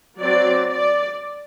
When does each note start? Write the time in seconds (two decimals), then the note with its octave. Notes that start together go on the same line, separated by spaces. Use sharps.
0.18 F#3 C4 D5
0.69 D5